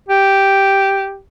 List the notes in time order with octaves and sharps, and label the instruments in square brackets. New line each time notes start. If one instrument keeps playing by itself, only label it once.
[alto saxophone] G4